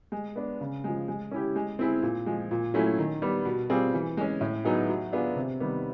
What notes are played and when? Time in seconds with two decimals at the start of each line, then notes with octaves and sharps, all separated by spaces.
0.12 G#3
0.36 B3 D4
0.61 C#3
0.84 F3 G#3
1.08 G#3
1.31 C#4 E4 G4
1.56 G#3
1.79 C4 E4 G#4
2.03 A#2
2.26 F3 G#3
2.51 A#2
2.74 F#3 A3 C#4 E4
2.98 D#3
3.22 G3 B3
3.45 B2
3.70 G3 C4 F4 G#4
3.94 E3
4.17 G#3 C#4
4.41 A2
4.65 F#3 B3 D#4 G#4
4.89 F#3
5.13 B3 D4 F4 G#4
5.36 C3
5.60 D#3 G3 B3